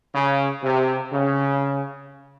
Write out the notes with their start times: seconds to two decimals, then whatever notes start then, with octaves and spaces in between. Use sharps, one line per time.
0.14 C#3
0.64 C3
1.12 C#3